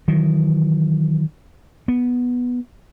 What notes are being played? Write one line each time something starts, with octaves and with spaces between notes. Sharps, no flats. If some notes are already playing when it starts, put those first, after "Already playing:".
D#3 E3 F#3
B3